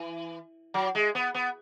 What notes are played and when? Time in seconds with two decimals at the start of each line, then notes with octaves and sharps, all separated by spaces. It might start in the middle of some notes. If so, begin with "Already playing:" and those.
Already playing: E3
0.74 F#3
0.95 G#3
1.15 B3
1.34 B3